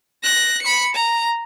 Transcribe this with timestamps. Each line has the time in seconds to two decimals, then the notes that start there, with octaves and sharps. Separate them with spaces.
0.24 F#6 A#6
0.62 B5 C#7
0.95 A#5